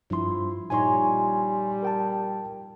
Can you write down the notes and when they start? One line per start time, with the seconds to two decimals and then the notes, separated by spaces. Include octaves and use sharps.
0.10 G2 F3 E4 C6
0.70 A#2 G3 D#4 C#5 G#5 C6
1.82 A#4 G5 A5